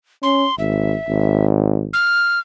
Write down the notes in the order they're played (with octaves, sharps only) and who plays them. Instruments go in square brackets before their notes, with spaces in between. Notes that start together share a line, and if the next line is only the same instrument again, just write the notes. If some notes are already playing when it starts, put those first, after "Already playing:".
[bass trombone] C#4 [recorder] C6
[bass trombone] G#1 [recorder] E5
[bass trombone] G#1
[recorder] F6